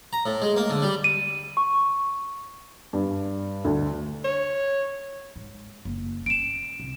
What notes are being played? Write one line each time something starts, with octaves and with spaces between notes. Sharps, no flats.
A#5
A2
G#3
A#3
D3
G3
D#7
C#6
G2
D2
C#5
G#2
F#1
C#4 D7 E7
C2